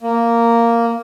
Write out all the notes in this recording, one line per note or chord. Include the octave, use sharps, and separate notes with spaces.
A#3